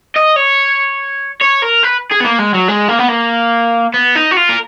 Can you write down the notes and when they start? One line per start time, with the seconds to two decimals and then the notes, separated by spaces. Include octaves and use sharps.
0.16 D#5
0.36 C#5
1.42 C#5
1.63 A#4
1.84 B4
2.12 G#4
2.21 B3
2.25 A#3
2.39 G#3
2.54 F#3
2.69 G#3
2.89 A#3
2.99 B3
3.08 A#3
3.94 B3
4.15 D#4
4.31 F#4
4.37 F4
4.49 A#4